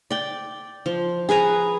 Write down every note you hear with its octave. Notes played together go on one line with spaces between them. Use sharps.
D5 G5
F3
G#4 B4 G#5 A#5